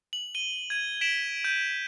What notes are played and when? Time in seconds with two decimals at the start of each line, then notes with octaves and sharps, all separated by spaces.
0.13 F#7
0.35 D#7 G7
0.70 G#6 D#7
1.01 B6 D7 E7 F#7
1.44 G6 D#7